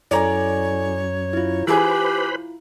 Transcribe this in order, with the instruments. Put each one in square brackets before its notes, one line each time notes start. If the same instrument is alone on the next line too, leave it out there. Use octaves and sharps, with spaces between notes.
[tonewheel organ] F#2 [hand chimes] E4 A4 G#5 [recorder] C#5 [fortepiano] D5 A#5
[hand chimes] E4 F4
[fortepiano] E3 G#4 [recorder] G4 [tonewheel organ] B4 C5 B5